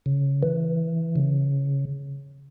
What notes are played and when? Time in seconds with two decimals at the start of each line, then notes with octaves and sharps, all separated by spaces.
0.06 C#3
0.43 E3
1.16 C#3